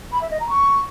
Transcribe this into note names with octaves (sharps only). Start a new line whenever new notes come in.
B5
E5
D#5
A#5
C#6